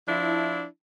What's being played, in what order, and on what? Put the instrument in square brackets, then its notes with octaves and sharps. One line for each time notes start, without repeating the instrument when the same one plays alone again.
[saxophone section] F3 D4 E4